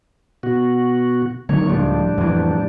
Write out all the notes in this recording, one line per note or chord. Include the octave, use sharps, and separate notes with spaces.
B2 F#4
D3 D#3 F#3 A#3 C#5
C#2 A2 F3 G3 D4
F2 E3